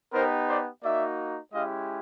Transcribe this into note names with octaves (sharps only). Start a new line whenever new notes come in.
B3 D#4 G4 A#4 C5
C5 D5
A#3 D#4 F#4 D5 E5
G#3 C#4 E4 G4 D#5 F5